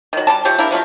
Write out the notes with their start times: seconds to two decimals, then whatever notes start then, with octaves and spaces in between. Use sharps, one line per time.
0.13 D#3 F#3
0.27 G3 A5
0.45 F3 A3 G4 C#5
0.58 A#3 D4 E4 A#4
0.71 F3 F#3 A3 F4